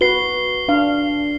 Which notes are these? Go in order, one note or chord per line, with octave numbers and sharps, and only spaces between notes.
F#4 B4 C7 G7
D4 F5